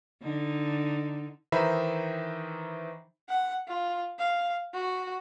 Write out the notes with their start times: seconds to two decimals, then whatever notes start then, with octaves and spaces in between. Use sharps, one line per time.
0.22 D3 D#4
1.52 D#3 E3 D#4 C5 E5 B5
3.29 F#5
3.68 F4
4.19 F5
4.74 F#4